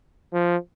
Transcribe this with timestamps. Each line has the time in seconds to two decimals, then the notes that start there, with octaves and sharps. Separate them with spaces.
0.33 F3